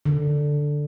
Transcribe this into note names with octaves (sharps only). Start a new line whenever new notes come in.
D3